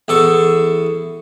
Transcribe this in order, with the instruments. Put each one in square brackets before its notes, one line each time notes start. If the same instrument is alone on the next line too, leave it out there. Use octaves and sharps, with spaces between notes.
[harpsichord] E2 A4 C#6